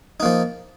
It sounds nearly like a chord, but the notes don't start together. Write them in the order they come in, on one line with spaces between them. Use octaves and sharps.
D#4 A#3 F3